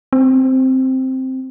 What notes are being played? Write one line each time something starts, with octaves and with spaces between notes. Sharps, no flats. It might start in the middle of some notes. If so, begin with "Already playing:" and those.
C4